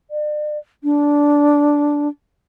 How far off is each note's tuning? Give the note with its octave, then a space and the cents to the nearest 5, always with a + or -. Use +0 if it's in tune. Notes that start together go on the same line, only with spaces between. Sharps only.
D5 +40
D4 -10